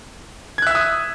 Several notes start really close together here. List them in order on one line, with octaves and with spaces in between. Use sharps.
G#6 F#6 E5 E6 D#6